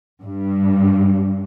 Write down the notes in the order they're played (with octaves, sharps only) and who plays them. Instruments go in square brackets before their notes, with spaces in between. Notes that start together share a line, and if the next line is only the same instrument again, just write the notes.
[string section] G2